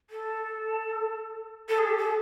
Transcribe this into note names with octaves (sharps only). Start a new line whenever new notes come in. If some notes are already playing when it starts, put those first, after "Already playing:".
A4
A4
G#4
G4
A4